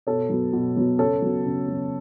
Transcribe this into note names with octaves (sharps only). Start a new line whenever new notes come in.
B2 A4 C#5
F#3 B3
B2
F#3 B3
C#3 A4 C#5
F#3 B3
C#3
F#3 B3